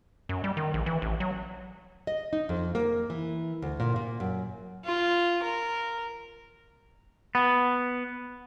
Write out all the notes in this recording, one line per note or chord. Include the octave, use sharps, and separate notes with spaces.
F#2
G3
D#3
A#1
E3
A1
F#3
D#5
D#4
F2
A#3
E3
D2
A#2
A#2
F#2
F4
A#4
B3